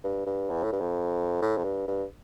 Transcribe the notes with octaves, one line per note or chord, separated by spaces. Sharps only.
G2
G2
E2
A2
G2
F2
A2
F2
G2
G2